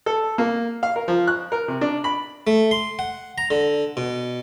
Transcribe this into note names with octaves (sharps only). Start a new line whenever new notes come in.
A4
A#3
F5
A#4
F3
F#6
A#4
C3
D4
B5
A3
C6
F#5
A#5
D3
B2